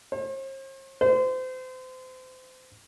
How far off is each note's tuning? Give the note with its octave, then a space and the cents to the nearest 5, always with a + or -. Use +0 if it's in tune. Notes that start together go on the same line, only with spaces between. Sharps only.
C5 +45
C5 -30